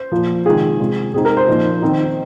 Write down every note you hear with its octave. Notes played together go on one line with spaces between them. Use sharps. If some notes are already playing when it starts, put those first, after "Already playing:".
Already playing: C5
A#2 F3 A#3 F4
C3 D#3 G#3 F4 G#4
C3 G#3 F4
C3 G#3 C4 D#4 G#4
A#4
C5
A#2 F3 A#3 D#4
D#3 C4 D#4